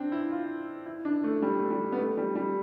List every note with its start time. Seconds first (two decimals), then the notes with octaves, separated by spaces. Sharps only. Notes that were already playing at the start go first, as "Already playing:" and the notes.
Already playing: C4 D4
0.12 E4
0.31 F4
0.86 E4
1.05 D4
1.24 A3
1.42 G3
1.59 A3
1.70 G3
1.92 B3
1.99 A3
2.17 G3
2.35 G3